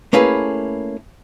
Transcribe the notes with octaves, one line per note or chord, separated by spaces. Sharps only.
A3 A#3 C#4 E4 G#4 B4